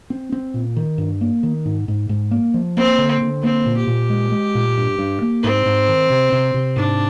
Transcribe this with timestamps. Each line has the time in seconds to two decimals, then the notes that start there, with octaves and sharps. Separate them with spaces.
0.10 C4
0.32 C4
0.54 A#2
0.76 D#3
0.98 G2
1.21 A#3
1.43 D#3
1.65 G#2
1.88 G#2
2.09 G#2
2.31 A#3
2.54 F3
2.77 A#3 C4
2.98 D3
3.21 D3
3.43 A#3 C4
3.66 A#2
3.77 G4
3.87 A#2
4.10 G#3
4.31 G#3
4.55 A#2
4.77 G2
4.99 G2
5.22 A#3
5.43 G#2 C4
5.66 G#2
5.88 D#3
6.10 C3
6.32 C3
6.54 C3
6.76 G#2 D4